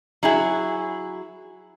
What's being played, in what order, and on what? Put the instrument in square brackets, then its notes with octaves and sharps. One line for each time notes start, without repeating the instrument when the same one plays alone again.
[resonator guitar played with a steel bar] F#3 E4 G#4